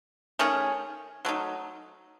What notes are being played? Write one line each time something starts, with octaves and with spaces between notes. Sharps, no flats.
D#3 A3 C#4 G#4
F#3 A3 D#4